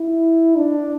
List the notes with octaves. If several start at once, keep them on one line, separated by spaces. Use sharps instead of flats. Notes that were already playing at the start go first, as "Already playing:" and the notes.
Already playing: E4
D4